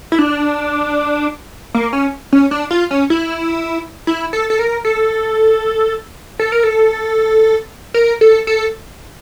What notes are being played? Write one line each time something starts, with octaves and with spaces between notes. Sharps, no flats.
E4
D4
A#3
C#4
C#4
D4
F4
C#4
E4
E4
A4
A4
A#4
A4
A4
A#4
A4
A#4
A4
A4